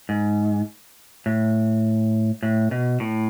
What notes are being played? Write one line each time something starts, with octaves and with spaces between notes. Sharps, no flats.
G#2
A2
A2
B2
A2